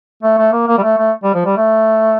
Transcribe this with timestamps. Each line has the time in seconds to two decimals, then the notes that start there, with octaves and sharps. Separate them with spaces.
0.23 A3
0.38 A3
0.53 A#3
0.68 A#3
0.78 G3
0.83 A3
0.98 A3
1.24 G3
1.35 F3
1.46 G3
1.57 A3